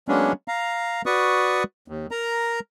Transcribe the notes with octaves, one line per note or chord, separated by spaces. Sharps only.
F#3 G#3 A#3 B3 C#4 D4
F5 A#5
F#4 B4 D5 C#6 D#6
D#2
A#4 A#5